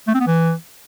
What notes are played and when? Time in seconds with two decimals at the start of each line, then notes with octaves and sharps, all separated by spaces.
0.08 A3
0.14 C4
0.20 B3
0.27 E3